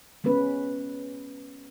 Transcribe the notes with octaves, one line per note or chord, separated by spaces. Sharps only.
G#3 B3 C#4 B4